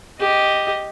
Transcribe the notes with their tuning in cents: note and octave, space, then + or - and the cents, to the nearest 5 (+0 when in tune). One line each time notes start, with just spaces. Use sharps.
G4 +0 D#5 +0